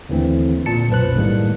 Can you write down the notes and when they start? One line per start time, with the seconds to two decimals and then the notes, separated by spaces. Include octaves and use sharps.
0.09 D#2 D3 E3 A3 C4
0.66 A#2 A5 C#7
0.90 B1 F#2 B4 C5 F#6
1.16 A2 D#3 G3 G#3 A#3